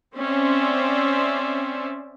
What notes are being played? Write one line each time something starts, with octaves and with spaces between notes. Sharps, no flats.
C4 C#4 C5 D5 E5